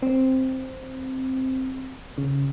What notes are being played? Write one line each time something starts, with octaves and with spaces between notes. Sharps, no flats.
C4
C#3